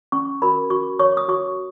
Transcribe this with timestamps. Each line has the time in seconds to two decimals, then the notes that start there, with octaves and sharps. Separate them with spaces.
0.12 C#4 C#6
0.42 F#4 A#4 B5
0.70 F#4 C#6
0.99 C#5 C#6
1.17 D#6
1.28 F#4 C#6